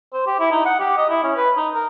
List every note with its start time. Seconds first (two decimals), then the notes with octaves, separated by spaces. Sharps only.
0.13 C5
0.26 G4
0.39 E4
0.51 D#4
0.66 F#5
0.80 G4
0.97 D#5
1.09 E4
1.23 C#4
1.36 B4
1.57 D#4
1.75 A#4